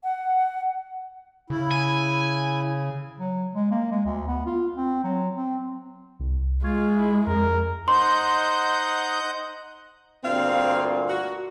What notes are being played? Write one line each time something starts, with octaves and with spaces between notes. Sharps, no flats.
F#5
C#3 E4
G#5
F#3
G#3
A#3
G#3
D2
B3
F4
C4
F#3
C4
C2
G#3 F4 C#6 G#6
E4
F2 A#4
D#4 C5 D#5 F#5 C6 G6
D2 G2 A#2 C4 F5
F#4